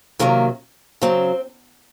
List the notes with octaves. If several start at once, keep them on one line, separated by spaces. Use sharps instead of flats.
C3 D#3 F#3 A#3
C#3 F#3 C4